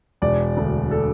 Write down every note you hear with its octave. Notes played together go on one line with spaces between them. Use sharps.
E1 D5
D2 D3
A4